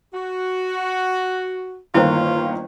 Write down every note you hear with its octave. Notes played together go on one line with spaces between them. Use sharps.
F#4
G1 D#3 A#3 E4 F4 C5